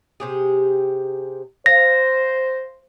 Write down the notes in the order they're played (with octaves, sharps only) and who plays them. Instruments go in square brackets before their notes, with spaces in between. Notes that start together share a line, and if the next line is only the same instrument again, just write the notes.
[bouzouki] C3 G4 G#4
[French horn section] C5 [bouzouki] F5 [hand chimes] A#6